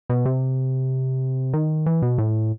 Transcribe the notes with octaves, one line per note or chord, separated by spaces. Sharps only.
B2
C3
D#3
E3
B2
A2